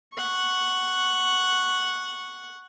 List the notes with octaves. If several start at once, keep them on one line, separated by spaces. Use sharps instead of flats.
F#5 C#6